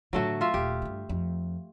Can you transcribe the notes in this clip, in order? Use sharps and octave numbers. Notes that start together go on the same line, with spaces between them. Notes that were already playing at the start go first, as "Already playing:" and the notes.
A2 D3 F#3 A3 F#4
F4 E5 F5
D#1 G4
G2 D3
F2